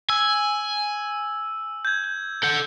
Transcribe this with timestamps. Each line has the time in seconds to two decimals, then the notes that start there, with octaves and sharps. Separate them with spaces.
0.10 G#5 E6
1.85 G6 G#6
2.43 A4 F#5 G6